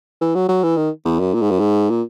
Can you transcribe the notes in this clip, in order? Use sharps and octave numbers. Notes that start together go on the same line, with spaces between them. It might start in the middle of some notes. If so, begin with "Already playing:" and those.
E3
F#3
F#3
E3
D#3
E2
F#2
A#2
G#2
F#2
G#2
A#2